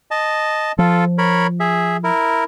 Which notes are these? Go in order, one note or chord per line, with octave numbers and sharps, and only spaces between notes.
D#5 A5
F3 F4 A4
A#4 C#5 B5
G#4 E5
E4 A#4